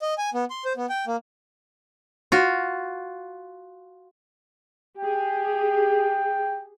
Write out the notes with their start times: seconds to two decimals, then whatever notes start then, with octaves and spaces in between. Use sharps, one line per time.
0.02 D#5
0.18 G#5
0.34 B3
0.50 C6
0.65 C5
0.77 B3
0.89 G5
1.07 A#3
2.32 F4 F#4
4.99 G4 G#4 G5